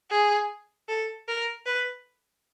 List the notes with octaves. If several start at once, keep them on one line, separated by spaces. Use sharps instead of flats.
G#4
A4
A#4
B4